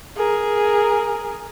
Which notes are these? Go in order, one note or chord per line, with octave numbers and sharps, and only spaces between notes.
G#4 A#4